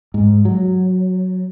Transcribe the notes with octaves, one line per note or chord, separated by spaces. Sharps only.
G#2
F#3